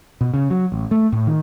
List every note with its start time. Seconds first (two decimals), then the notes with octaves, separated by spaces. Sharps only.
0.21 B2
0.34 C#3
0.50 F#3
0.72 A1
0.91 A3
1.12 A2
1.27 D#3